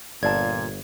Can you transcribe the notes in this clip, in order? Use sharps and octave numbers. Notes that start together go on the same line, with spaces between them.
G1 A#2 D5 F5 A5 G#6